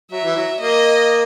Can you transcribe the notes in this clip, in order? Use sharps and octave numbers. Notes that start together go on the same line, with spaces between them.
F#3 E5
E3
F#3
A#3 D#5